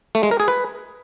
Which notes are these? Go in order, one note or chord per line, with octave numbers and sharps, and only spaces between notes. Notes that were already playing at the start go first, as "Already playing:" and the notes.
A3
G#3
A#4
G#4
B4